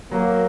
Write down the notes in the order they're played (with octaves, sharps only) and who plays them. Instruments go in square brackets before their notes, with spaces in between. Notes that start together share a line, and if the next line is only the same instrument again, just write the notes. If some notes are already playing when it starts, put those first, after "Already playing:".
[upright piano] F#3 [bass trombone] A#3